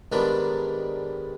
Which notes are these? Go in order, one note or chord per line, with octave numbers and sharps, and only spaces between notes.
G#2 D#3 G3 B3 D4